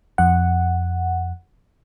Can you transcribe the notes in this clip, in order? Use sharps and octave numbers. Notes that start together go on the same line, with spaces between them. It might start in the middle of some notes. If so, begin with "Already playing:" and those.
F2 F#5